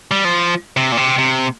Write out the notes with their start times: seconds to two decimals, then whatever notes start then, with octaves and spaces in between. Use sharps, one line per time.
0.11 G3
0.25 F3
0.77 C3
0.92 A#2
0.97 C3
1.18 C3